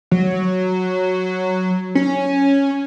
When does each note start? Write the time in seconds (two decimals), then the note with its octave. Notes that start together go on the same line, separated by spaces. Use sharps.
0.11 F#3
1.95 C#4